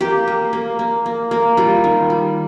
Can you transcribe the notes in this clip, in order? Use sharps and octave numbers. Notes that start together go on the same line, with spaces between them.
A#3 G4
A#3
A#3
A#3
A#3
A#3
G3 F4
D#3
G3